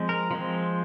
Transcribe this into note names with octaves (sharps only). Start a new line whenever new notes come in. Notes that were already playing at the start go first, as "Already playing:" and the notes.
Already playing: F3 G#3 C4
A#4
F3 G#3 C4